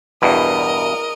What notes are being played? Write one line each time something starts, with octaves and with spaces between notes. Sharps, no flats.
E2 G2 B2 A#4 D#5